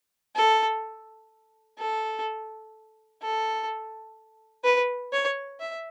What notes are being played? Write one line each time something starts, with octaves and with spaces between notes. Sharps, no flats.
A4
A4
A4
B4
C#5
E5